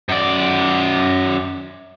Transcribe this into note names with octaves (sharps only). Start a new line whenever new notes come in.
F#2 D5